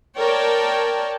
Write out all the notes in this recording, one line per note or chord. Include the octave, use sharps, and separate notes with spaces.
A#4 C#5 D5 G5 A5